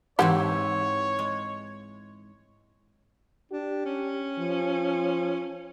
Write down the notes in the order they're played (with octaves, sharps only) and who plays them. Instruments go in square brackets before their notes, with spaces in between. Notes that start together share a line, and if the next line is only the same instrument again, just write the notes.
[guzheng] G#2 E3 C4 [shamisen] G4 F#5 [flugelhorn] C#5
[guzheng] G#3
[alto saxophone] D4 [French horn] G4
[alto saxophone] C#4
[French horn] F3